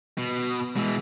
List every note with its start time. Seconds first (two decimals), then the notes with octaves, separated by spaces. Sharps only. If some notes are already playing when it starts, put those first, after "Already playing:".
0.18 B2
0.76 B2 E3 G#3